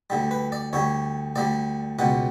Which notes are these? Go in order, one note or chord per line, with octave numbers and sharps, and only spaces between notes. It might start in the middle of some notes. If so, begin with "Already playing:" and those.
D2 D3 G3
B4
D5
D2 D3 G3 C#5
D2 D3 G3 D5
C#2 B2 G3 F#5